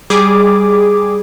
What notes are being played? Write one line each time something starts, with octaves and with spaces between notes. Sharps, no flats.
G3 G#4 D6